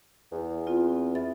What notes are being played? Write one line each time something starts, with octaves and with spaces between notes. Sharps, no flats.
E2
C4 F4
E4 A6